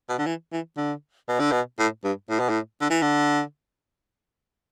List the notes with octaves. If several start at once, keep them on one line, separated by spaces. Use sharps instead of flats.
B2
D3
E3
E3
D3
B2
D3
B2
A2
G2
A2
B2
A2
D3
E3
D3